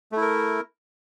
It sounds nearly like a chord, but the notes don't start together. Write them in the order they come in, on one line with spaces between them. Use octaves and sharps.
A3 E4 A#4